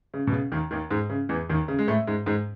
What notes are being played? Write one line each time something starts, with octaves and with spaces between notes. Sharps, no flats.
C#3
B2
C#3
D#2 D#3
D#2 D#3
G#2 G#3
C#3
E2 E3
D#2 D#3
C#3
G#3
A2 A3
G#2 G#3
G#2 G#3